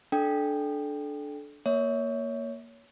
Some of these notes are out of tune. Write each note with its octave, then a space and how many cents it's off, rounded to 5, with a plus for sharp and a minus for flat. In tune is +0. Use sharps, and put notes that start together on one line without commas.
D4 +0 A4 -25 G5 +5
A#3 +0 C#5 +20 E5 -25